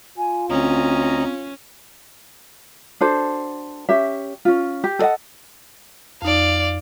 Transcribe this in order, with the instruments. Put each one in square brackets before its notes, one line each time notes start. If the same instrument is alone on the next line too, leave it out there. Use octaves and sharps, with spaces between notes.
[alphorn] F4 [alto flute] G#5
[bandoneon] D2 D#5 A#5 [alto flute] C4 [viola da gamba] C#4
[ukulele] D4 F#4 A4 C5
C#4 G4 E5
C#4 F4
G4
A4 D#5 F#5
[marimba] F2 D#4 [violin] D5 F5